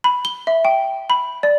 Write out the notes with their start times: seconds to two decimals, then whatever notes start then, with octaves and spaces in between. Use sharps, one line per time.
0.04 B5
0.25 G7
0.47 E5
0.65 G5
1.10 B5
1.43 D5